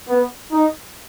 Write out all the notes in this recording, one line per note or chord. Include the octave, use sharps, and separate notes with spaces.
B3
D#4